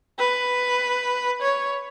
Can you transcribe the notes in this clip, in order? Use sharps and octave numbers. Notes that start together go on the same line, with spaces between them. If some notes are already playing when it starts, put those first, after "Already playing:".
B4
C#5